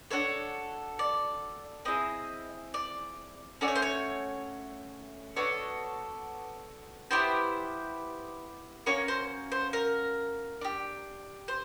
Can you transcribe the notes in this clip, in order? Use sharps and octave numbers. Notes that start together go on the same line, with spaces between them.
D4 F#4 A4 C#5
D5
C4 E4 G#4 D#5
D5
A3 C#4 F#4 D5
C#5
C5
C#5
B3 D4 F#4 A4 C#5
B3 E4 G4 C5
A#3 C#4 F#4 C#5
C5
C5
A#4
D4 G4
C5